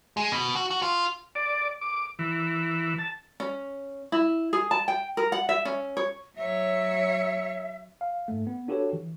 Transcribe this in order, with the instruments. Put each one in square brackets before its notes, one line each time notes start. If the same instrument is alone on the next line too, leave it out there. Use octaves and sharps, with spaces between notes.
[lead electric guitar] G#3
B2
F#4
F#4
F4
[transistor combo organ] D5
D6
E3
A5
[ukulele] C#4
E4
G#4
A5
G5
A#4
F#5
E5
C#4
C#5
[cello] F#3 C#5 [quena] E5
[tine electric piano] F5
G#2 A3
B3
D4 F#4 G4 A4 B4 C#5
E3